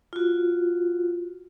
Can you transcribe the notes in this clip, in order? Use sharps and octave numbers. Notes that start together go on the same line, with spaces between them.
F4 F#4